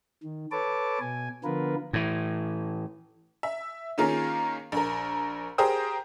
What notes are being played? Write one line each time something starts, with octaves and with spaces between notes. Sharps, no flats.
D#3
A4 B4 C#5 A5 D6
B2 G#5
D3 F3 B3 F4 A#4 B4
A2 E3
E5
D#3 A#3 C#4 F4 G#4 A#4
A#1 A#4
G4 G#4 A#4 C5 G5 D#6